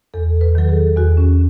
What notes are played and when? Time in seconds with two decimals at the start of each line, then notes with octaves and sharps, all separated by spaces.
0.14 E2 A4
0.41 B4
0.55 D#3 F#3 A4
0.69 G#4
0.97 E2 F#4
1.17 C#4